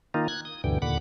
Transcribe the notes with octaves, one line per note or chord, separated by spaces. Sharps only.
D#3 A#3 D#4 F4
F#6 G#6
D#6
D2 G2 B2 D3 E3 G5
D#2 A#2 D3 F#5 B5 D6